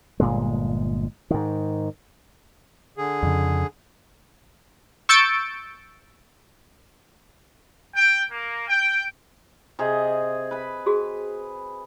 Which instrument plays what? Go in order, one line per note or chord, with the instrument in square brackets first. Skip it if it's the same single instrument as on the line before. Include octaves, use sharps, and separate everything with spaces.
[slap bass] G1 A#2 G#3
G#2 D#3
[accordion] D3 G#4
[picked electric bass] F2 C#3
[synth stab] C#6 E6 G6 A6 C#7 D7
[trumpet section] G5
A#3
G5
[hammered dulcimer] C3 G#4 D#5
B4 B5
[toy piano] F#4 G#4